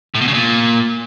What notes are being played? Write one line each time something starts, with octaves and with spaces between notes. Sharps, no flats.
A2
B2
C#3
A#2